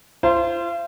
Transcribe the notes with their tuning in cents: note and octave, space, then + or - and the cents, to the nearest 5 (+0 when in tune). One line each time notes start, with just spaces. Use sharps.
F4 -40 C5 +0